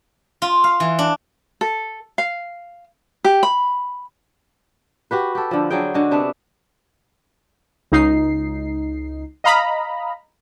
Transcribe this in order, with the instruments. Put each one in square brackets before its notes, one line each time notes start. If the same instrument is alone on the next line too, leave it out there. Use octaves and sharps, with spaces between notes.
[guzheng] F4
F5
E3
D4
[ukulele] A4
F5
G4
B5
[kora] F#4 G4 B4
G4 A4
D3 F3
D3 F#3 G#4 G5
D3 G#3 F#4
C3 B3 D4 E5
[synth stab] C#2 D#4 C7
D#5 F5 A#5 B5